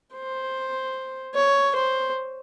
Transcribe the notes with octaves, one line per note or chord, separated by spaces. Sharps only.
C5
C#5
C5